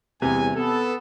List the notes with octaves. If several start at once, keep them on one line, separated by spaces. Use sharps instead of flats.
E2 G2 C3 G#5
B3 A4